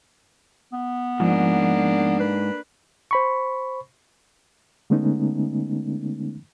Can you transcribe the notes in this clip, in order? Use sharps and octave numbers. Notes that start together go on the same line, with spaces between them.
B3
G#2 F3 A#3 D4
B4
C5 B5 C#6
D3 G#3 A3 B3 C#4 D#4